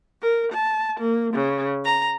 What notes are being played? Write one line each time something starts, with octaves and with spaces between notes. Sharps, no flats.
A#4
A5
A#3
C#3
A#5